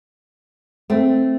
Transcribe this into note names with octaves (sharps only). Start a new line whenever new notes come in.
A3 C4